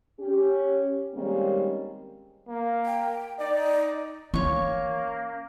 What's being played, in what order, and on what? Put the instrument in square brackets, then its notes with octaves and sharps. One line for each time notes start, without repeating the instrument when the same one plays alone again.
[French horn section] C#4 G4
D#3 G3 G#3 A#3 C4 C#4
[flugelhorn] A#3
[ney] G5
[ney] D#4 [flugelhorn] D5
[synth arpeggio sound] E3 [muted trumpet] A#3 [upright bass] C#4 [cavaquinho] C#5 C#6